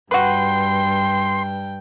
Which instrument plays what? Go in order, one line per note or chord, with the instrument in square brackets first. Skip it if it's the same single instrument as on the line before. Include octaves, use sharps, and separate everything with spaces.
[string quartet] G2 G5 [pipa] F#4 B4 [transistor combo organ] C6